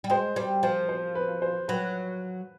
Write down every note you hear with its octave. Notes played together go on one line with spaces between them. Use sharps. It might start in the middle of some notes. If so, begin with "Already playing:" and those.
G3
G#3 C5
G3 C5
F3 C5
C5
B4
C5
F#3 B4